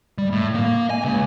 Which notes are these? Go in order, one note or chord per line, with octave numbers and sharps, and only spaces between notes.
G3
A2
A#3
G#5
C#3 G#3